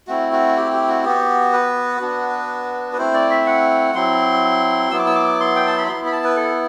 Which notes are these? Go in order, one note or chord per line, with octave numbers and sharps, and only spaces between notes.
A3 C4 E4 F#4
F#4
G4
G4
F#4
B3 F#4 G4
B4
B3 D4 F#4
B4
A3 C4 E4 C5
D5
E5
F#5
F#3 C4 E4 C6
F#3 B3 E4 E6
D6
E6
D6
C6
G5
A5
B5
B3 E4 C6
B5
A5
B4
A4